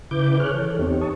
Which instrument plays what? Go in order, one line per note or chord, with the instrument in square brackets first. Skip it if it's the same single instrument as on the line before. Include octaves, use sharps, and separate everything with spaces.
[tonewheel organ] C#3 E4 B4 D6 G6
G#4 C#5 F6 F#6
E3 A4 C#5
E2 B3 C4 D#4 G4 C#5
A5 C#6 D#6